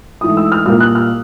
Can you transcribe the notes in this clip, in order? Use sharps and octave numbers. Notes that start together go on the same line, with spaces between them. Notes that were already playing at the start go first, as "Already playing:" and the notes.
G#2 E3 A3 D#6
E6
F6
C2 A#2 G3 A#3 F6
F#6
F6